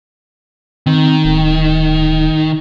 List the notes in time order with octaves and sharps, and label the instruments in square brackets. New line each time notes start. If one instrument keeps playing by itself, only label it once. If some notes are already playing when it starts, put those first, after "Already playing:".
[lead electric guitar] D#3 [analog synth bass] C4
[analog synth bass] D1